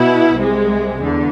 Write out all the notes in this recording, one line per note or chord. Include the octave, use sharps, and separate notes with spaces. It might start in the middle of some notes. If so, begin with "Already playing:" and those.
Already playing: B2 B3 E4
C2 C3 G#3
E2 D3